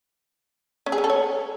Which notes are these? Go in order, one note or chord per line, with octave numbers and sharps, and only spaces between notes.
C#4
G#4
C#4
A4
C#5